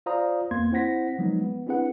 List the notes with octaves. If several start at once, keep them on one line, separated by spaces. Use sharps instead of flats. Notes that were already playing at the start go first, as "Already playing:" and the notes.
F4 C5 D5 F5 A#5 D#6
F2 A#3 B3 C6 G#6
C4 E4 C5 F#5 A#6 B6
F3 F#3 G#3 B3 D#4
B3
C4 D4 E4 G#4 B4 F#5